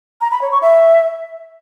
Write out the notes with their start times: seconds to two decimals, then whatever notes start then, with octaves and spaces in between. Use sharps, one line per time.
0.21 A#5
0.31 B5
0.42 C#5
0.52 C#6
0.62 E5